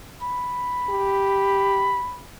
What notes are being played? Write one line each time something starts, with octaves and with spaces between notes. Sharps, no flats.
B5
G4